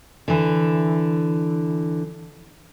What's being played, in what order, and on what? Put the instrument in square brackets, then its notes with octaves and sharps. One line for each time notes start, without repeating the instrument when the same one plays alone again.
[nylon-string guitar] D3 E3